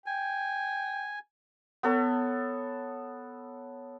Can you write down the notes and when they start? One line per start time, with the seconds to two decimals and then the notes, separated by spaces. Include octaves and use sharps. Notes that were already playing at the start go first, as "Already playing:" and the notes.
0.06 G5 G#5
1.83 B3 A4 C#5